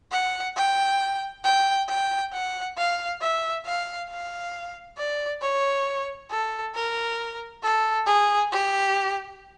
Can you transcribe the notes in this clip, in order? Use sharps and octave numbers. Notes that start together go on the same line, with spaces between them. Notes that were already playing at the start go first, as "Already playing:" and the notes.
F#5
G5
G5
G5
F#5
F5
E5
F5
F5
D5
C#5
A4
A#4
A4
G#4
G4